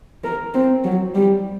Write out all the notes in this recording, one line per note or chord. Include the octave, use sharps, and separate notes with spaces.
A#4
C4
F#3
G3